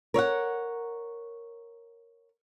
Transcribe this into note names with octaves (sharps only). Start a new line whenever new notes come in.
A#4 C#5 E5 F#5